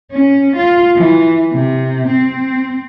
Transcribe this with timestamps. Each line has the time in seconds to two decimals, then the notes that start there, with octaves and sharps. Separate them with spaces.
0.12 C#4
0.56 F4
0.96 E3
1.53 C3
2.08 C4